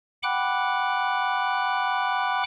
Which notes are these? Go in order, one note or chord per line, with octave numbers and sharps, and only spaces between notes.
F#5 G5 B5 D6 F#6